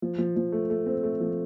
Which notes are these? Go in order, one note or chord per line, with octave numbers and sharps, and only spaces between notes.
F3
F3
F3
A3
A3
C4
A3
F3